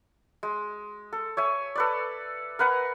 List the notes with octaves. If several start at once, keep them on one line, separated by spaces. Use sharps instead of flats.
G#3
A4
C#5 E5 G#5
A4 B4 D5
A#4 B4 F#5 G#5